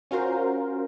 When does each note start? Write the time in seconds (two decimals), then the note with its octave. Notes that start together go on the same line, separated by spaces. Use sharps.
0.11 C#4 F4 F#4 A#4 C5